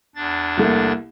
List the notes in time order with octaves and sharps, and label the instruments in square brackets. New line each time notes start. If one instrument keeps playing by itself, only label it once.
[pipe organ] E2 D4 A6
[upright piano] C2 A3 A#3